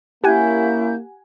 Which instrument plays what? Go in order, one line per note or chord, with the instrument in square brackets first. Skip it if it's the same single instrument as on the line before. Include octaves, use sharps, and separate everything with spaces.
[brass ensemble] A#3 [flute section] C#4 E4 G6 [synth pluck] G4 F#5 G#5